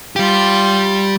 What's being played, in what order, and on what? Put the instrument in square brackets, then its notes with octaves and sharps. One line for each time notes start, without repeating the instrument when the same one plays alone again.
[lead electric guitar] G3 G4 [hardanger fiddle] F4 C6